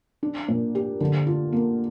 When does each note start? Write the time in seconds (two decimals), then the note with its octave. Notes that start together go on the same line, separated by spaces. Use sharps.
0.23 D4
0.48 A#2
0.75 G4
1.01 D3
1.27 F4
1.52 A#3